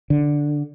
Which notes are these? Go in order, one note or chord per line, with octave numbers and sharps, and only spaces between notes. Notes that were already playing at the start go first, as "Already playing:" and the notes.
D3